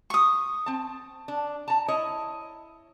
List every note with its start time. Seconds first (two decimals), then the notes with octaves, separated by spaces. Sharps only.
0.10 C#6 D#6
0.66 C4 A5
1.28 D4
1.68 A5 A#5
1.88 E4 C#5 D#5